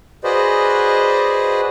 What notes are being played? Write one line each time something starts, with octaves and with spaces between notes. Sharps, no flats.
F#4 G#4 B4 C5 D5 D#5